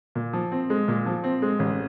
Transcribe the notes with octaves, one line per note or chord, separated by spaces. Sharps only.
A#2
F3
C4
G#3
A#2
F3
C4
G#3
A1